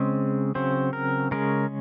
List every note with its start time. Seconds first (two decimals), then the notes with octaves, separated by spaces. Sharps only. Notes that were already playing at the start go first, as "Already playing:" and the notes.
Already playing: C#3 G#3 C4 C5
0.55 C#3 F#3 C4 C5
0.93 A#4
1.31 C#3 G#3 C#4 A#4